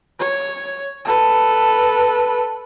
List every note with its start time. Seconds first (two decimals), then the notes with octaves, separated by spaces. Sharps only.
0.19 C#5
1.05 A4 B4